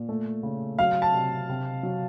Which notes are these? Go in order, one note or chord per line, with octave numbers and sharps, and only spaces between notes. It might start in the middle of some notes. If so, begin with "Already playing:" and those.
Already playing: A#2
A3
C#3
F#3 F5
A5
C3
C3
F#3